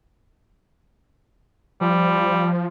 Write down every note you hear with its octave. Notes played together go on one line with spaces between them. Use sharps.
F3 G3